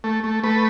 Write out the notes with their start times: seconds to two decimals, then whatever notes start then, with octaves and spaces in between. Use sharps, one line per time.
0.04 A3
0.24 A3
0.44 A3 B4